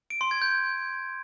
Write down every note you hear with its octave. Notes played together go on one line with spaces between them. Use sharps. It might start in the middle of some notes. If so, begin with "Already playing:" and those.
D7
C6
G#6
G6